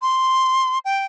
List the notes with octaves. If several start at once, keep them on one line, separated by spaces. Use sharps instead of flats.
C6
G5